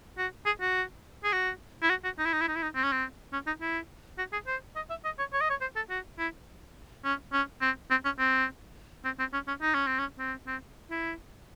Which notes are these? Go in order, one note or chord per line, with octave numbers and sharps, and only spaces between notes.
F#4
G#4
F#4
G#4
F#4
E4
F#4
F#4
D#4
E4
D#4
E4
D#4
E4
D#4
C4
C#4
C4
C#4
D#4
E4
F#4
G#4
C5
D#5
E5
D#5
C#5
C#5
D#5
C#5
C5
A4
F#4
E4
C#4
C#4
C4
C4
C#4
C4
C4
C4
C#4
C#4
D#4
C#4
C4
C#4
C4
C4
E4